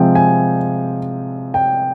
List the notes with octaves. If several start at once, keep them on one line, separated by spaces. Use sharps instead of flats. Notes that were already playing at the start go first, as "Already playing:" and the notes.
Already playing: C3 F3 G#3 C4 G5
G#5
G5